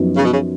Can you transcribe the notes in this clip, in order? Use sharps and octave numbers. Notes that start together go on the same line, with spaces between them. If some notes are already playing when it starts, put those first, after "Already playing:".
Already playing: F#2 F3 B3 D#4
C#3
B2
C#3